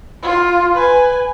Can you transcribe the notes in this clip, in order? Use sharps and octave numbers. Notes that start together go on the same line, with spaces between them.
F4
B4 G#5